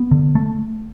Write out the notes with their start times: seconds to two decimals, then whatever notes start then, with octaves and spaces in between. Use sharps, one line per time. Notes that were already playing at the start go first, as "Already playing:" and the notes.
Already playing: B3
0.11 D3
0.35 A3